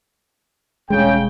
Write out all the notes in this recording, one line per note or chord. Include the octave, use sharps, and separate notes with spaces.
E1 C#3 G3 G#3 G5